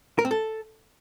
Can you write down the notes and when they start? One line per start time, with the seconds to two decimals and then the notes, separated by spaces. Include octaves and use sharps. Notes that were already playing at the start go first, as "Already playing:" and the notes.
0.19 A#4
0.25 C4
0.31 A4